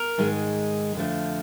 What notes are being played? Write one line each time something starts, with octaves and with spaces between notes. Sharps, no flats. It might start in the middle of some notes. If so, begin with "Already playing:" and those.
Already playing: A#4
G#2 D#3 G#3
F2 D3 F3 A3